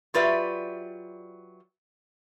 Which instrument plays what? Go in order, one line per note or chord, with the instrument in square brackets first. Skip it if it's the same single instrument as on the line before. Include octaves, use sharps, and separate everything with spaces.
[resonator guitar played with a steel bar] F#3 F4 G4 B4 D5 E5